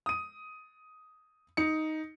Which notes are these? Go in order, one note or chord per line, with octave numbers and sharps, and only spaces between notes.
D#6 D#7
D#4 C#7